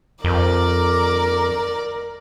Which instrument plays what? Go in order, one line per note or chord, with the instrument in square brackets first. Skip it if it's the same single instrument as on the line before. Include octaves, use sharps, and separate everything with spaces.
[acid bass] F2 [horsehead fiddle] A#4 [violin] D5 D6